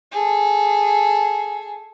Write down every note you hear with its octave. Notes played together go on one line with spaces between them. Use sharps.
G#4 A4